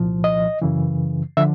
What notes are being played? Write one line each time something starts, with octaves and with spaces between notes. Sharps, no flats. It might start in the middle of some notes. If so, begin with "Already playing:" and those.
Already playing: C2 A#2 F3
D#5
F#2 C#3 E3
D3 F3 E5